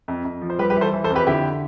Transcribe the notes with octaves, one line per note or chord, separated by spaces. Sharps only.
F2
F2
F3
C5
G3 G4 B4
G4 B4
E3
A4 C5
E3
A4 C5
F2
G4 B4
D3 E4 G4